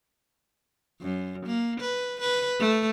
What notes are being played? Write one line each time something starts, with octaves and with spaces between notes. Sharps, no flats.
F#2
A#3
B4
B4
A3